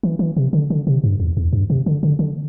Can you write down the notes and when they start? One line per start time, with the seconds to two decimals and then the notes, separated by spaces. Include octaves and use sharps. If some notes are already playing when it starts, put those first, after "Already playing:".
0.03 E3
0.19 E3
0.37 C3
0.53 D3
0.70 D3
0.87 C3
1.04 G2
1.20 E2
1.37 E2
1.53 G2
1.70 C3
1.86 D3
2.03 D3
2.19 D3